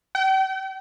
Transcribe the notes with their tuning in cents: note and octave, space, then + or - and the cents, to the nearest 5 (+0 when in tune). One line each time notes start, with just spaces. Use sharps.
G5 -40